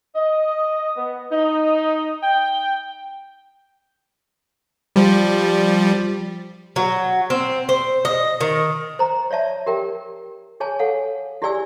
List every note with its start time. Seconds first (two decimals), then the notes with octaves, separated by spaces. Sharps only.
0.15 D#5
0.95 B3
1.30 D#4
2.22 G5
4.96 F3 G3
6.76 F#3
7.30 C4
7.69 C5
8.05 D#5
8.41 D#3
8.99 C5 A#5
9.31 C#5 D5 E5 A5
9.66 G4 A#4 G5
10.60 G#4 C#5 G#5 A5
10.79 A4 C#5 F5 F#5
11.42 E4 G4 G#4 D5 G#5 E6